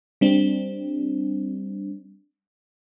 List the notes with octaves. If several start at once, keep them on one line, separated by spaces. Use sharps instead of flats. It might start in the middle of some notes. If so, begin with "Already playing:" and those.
G3 C4 D4